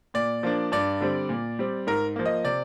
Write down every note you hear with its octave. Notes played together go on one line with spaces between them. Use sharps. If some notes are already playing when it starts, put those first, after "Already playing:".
A#2 D5
F3 A#3 D4
G2 D5
D3 G3 C4
A#2
G3 C4
G#2 A#4
F3 A#3
D#5
C3 D5